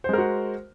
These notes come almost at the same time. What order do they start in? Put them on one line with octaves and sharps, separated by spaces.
C5 G#3 A#4 F#4